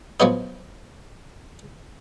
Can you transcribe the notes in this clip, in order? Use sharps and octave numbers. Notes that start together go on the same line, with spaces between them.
F3 F#3 B3 D#4